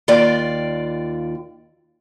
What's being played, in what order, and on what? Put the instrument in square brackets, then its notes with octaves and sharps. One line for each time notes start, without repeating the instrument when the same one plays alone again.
[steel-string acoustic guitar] D#2 F4 D5 G5